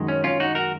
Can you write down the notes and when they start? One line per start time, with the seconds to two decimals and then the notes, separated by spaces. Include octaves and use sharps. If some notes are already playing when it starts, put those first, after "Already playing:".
Already playing: F#2 D#3 G#3
0.08 C#4
0.24 C#4 F4
0.40 D#4 F#4
0.55 F#4 A#4